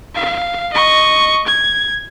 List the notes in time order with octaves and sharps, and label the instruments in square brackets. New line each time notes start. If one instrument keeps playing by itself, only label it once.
[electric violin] F5
D#5 C#6
G#6